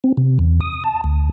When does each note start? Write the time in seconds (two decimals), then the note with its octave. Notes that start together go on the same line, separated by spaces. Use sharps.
0.04 C4
0.17 C3
0.39 E2
0.61 D#6
0.84 A5
1.04 D2